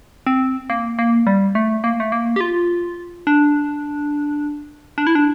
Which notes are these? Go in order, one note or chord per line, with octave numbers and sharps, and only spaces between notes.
C4
A#3
A#3
G3
A3
A#3
A3
A#3
G4
F4
D4
D4
E4
D4